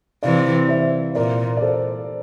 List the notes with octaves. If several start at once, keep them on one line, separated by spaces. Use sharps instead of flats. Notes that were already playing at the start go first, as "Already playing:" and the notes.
C3 E3 D5 F5
C5 E5
A#2 A#4 D5
D5
A4 C5